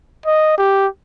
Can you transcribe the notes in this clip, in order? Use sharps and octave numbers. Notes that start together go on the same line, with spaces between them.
D#5
G4